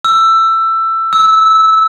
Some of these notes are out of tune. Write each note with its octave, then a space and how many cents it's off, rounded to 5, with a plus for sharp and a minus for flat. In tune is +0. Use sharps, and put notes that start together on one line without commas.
E6 +15
E6 -15